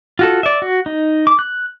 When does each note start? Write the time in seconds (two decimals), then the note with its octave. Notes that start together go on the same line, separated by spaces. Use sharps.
0.19 F4 F#4 A4
0.43 D5 E5
0.62 F#4
0.86 D#4
1.27 D6
1.39 F#6